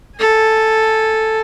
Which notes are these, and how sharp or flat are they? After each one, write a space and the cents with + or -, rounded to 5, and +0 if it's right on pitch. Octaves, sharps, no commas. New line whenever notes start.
A4 +0 G#5 +0